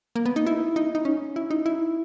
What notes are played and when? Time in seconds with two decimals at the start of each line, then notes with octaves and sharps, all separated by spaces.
0.16 A#3
0.25 B3
0.36 D#4
0.47 E4
0.76 D#4
0.95 D#4
1.05 C#4
1.36 E4
1.51 D#4
1.66 E4